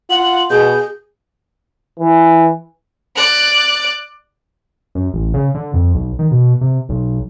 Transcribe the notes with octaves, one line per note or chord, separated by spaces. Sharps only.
F4 F#5 F#7
B2 G#4 G6
E3
D5 F#6
F#2
A1
C#3
D3
F2
B1
D#3
B2
C3
B1